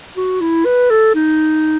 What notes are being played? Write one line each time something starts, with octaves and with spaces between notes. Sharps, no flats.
F#4
E4
B4
A4
D#4